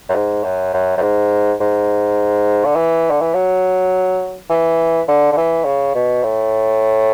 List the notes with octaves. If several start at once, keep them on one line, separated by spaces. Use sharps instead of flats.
F#2
G#2
F#2
F#2
F#2
G#2
G#2
D3
E3
D3
E3
F#3
E3
D3
D3
E3
C#3
B2
A2